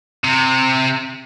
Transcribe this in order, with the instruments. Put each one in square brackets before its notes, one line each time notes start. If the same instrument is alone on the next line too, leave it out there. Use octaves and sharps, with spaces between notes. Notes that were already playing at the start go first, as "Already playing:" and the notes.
[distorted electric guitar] C3